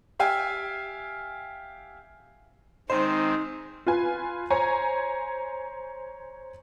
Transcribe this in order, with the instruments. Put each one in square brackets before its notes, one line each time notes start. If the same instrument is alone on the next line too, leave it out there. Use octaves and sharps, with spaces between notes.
[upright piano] G4 E5 F5 G5 G#5
[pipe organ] D#3 G#3 C4 [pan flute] D#4 [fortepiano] C5
[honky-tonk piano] F4 B4 G#5
C5 C#5 G#5 A#5